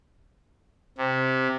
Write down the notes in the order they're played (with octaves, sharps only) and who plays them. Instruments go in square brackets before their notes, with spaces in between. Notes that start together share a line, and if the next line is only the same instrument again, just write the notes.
[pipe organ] C3